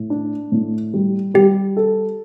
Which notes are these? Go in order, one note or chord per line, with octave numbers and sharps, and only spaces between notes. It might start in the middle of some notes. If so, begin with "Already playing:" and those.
Already playing: A2
D4
A2
G3
G3 G4
A4